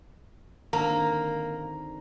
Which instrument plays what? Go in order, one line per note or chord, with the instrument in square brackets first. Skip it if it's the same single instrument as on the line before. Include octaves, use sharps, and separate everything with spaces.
[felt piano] G#1 D3 [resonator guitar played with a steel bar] A#3 [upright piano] A#5